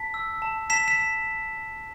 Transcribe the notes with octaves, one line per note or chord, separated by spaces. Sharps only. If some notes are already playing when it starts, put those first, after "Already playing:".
Already playing: A5 B6
E6
A5
A5 B6 E7
B6 E7